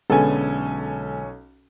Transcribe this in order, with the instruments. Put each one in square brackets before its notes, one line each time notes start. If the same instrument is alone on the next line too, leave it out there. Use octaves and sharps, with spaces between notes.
[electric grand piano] B1 C#4 [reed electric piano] D3 G#3 B3 [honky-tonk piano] A4 G#5